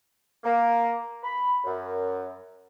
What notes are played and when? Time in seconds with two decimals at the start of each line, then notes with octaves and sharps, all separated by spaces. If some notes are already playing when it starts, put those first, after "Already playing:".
0.44 A#3
1.23 B5
1.64 F#2